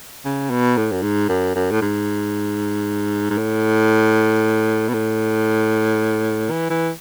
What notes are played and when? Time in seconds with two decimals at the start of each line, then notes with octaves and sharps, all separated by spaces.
0.25 C#3
0.50 B2
0.77 A2
0.92 F#2
1.02 G#2
1.29 F#2
1.55 F#2
1.71 A2
1.81 G#2
3.30 G#2
3.38 A2
4.88 B2
4.93 A2
6.50 E3
6.70 E3